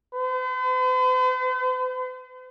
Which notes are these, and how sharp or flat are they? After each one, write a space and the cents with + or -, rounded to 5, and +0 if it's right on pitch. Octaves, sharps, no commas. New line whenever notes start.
C5 -45